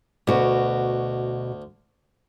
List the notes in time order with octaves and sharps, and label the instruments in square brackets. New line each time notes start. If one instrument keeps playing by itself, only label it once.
[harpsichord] D2 [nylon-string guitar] B2 F#4